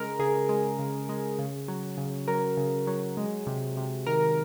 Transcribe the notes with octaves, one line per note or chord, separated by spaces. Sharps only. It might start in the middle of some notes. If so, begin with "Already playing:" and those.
Already playing: C#3 G#3 A#4
C#3 G#4
G#3
C#3
G#3
C#3
F#3
C#3
F#3 A#4
C#3
F#3
G#3
C3
C3
D#3 A#4